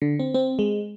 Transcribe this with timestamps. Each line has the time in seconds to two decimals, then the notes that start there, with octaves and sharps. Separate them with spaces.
0.02 D3
0.20 C4
0.34 C4
0.59 G#3